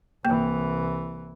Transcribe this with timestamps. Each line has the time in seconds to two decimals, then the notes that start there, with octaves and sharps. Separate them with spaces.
0.25 C2 E3 A#3 G5